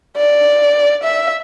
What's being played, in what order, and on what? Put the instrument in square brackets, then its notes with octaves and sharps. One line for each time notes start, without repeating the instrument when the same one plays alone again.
[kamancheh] D5
E5